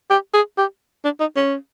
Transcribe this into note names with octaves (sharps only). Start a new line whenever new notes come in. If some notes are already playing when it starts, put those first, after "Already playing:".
G4
G#4
G4
D4
D#4
C#4